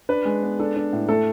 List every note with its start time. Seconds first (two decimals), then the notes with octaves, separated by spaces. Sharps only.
0.09 D4 B4
0.25 G#3
0.43 B3
0.59 D4 A4
0.76 D4
0.93 A2
1.09 A3 A4